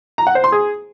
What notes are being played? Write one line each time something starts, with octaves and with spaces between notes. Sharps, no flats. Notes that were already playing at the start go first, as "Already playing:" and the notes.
A#5
F#5
C5
C6
G#4